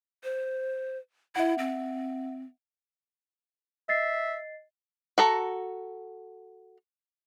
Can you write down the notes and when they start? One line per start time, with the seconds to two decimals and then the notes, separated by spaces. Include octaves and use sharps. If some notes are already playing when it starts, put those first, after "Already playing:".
0.24 C5
1.36 E4 E5 F#5
1.58 C4
3.89 D#5 E5 A6 C7
5.18 F#4 A4 A#5